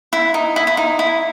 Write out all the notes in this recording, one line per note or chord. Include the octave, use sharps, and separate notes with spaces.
E4
D#4
E4
E4
D#4
E4